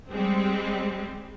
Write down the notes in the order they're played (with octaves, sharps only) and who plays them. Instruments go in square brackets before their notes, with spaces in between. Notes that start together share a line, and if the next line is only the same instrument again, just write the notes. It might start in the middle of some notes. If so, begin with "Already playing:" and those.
[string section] G3 G#3 C4